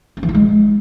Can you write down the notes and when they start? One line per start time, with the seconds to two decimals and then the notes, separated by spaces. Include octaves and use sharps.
0.17 C#4
0.23 E3
0.29 F4
0.35 G#3